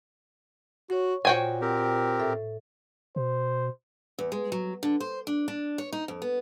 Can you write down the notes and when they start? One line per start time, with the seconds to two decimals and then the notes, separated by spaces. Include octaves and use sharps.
0.90 F#4 C#5 C#6
1.25 A#2 F#4 C5 C#5 G5 G#5
1.61 C4 G4 A#4
2.20 A2 A4 E5
3.16 B2 C5
4.19 E2
4.32 G#3
4.52 F#3
4.83 D3
5.00 C5
5.27 D4
5.48 D4
5.78 C#5
5.93 D#4
6.08 F2
6.22 B3